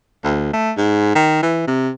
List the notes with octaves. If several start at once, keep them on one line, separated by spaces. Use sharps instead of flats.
D2
A3
G#2
D#3
E3
C3